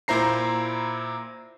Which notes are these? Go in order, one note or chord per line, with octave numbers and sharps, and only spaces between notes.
A#2 E4 C5 A#5 C7